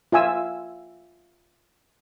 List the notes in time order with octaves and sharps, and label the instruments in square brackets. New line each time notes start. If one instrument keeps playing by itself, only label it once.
[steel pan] F4 E5 G#5 E6